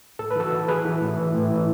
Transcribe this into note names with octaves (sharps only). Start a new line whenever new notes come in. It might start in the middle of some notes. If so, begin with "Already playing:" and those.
A2 A4
B4
E3 F#4 A4
E3
E3 G#4 B4
E3
A2
E3
A2
E3